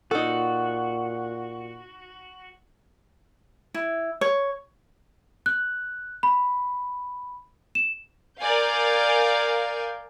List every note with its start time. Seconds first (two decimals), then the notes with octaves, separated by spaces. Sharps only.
0.11 A#2 D#4 F#4 A4
3.74 E4
4.21 C#5
5.46 F#6
6.23 B5
7.75 E7
8.40 A#4 D5 F5 G#5 G6